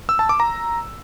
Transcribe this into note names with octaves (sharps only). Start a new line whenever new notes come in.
E6
A5
D6
A#5